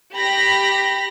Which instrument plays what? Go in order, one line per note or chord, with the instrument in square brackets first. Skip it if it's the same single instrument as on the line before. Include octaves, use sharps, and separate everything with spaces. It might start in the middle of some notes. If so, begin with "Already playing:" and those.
[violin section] G4 B5 A#6